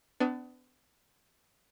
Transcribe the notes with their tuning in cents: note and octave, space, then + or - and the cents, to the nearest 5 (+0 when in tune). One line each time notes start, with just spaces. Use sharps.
B3 +35 D4 +0